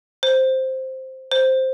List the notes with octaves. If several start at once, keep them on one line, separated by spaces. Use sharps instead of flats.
C5
C5